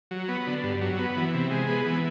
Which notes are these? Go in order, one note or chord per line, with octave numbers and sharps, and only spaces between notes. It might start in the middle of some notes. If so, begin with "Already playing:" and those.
F#3
B3
D3
G2
F#3
B3
E3
C3
G#3
B3
E3